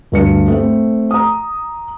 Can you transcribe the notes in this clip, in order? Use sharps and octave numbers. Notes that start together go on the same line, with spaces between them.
D2 G2 C#7
A3 C4
A#5 D#6